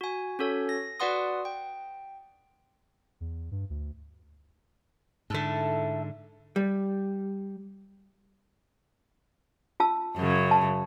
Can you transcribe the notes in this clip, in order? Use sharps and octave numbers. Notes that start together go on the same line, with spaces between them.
F#4 G#5
C#4 F#4 A4 C#5
A#6
F#4 B4 D5 F#5 C6 D#6
G5
E2
G2
D2
G#2 D3 A3 E4 A4
G3
F4 A5 E6
F#2 C#3
A5